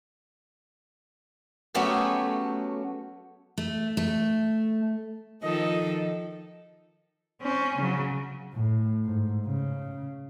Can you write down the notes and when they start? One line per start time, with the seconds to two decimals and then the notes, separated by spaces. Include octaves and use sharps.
1.74 F#3 A3 B3 C#4 G4 G#4
3.58 A3
3.97 A3
5.43 D#3 F3 A4 D#5
7.42 C4 C#4
7.77 C#3 F#3
8.54 A2
9.06 G#2
9.47 C#3